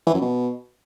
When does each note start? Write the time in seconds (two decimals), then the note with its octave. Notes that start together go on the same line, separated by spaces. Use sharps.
0.06 E3
0.14 F#2
0.21 B2